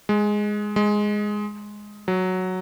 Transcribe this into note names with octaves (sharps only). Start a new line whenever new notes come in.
G#3
G#3
F#3